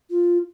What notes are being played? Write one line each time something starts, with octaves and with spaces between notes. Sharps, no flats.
F4